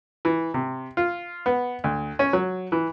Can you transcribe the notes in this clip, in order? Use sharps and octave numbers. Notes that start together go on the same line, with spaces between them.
E3
C3
F4
B3
D2
C#4
F#3
E3